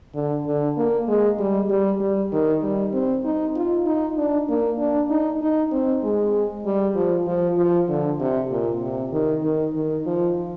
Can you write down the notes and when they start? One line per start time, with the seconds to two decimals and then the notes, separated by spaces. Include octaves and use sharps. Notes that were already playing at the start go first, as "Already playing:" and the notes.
0.14 D3
0.47 D3
0.77 A#3
1.08 G#3
1.39 G3
1.70 G3
2.00 G3
2.32 D#3
2.63 G3
2.93 C4
3.25 D#4
3.56 F4
3.86 D#4
4.17 D4
4.49 A#3
4.79 D4
5.09 D#4
5.41 D#4
5.71 C4
6.03 G#3
6.65 G3
6.95 F3
7.27 F3
7.57 F3
7.89 D3
8.20 C3
8.51 A#2
8.82 C3
9.12 D#3
9.43 D#3
9.75 D#3
10.06 F3